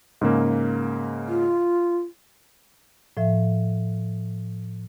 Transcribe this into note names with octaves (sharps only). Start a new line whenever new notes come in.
G#2 C#3 A#3
F4
A2 F3 E5